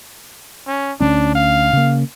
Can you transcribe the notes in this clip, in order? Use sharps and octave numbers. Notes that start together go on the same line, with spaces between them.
C#4
D2 G#3 C#4 D4
F5
C#3 A#3